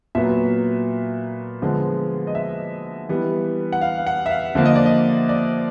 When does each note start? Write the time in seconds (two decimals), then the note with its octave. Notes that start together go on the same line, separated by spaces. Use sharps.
0.15 A#2 F#3 B3 E5
1.62 D3 F3 G#3 B3
2.27 D#5
2.35 E5
3.09 E3 G3 B3
3.73 F#5
3.81 F5
3.98 F5
4.07 F#5
4.26 E5
4.31 F5
4.55 D3 F3 A#3 E5
4.65 D#5
4.76 D5
4.86 D#5
5.29 D5